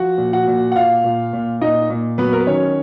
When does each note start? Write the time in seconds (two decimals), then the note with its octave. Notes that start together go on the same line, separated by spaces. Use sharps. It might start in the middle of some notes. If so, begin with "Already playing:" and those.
Already playing: F3 F#4 F#5
0.18 A#2
0.33 F#4 F#5
0.47 A#2
0.72 F#5
0.75 A#2 F4 F5
1.04 A#2
1.33 A#2
1.61 A#2 D#4 D#5
1.90 A#2
2.18 F#3 B3 B4
2.33 A#4
2.40 B4
2.47 D#3 C#4 C#5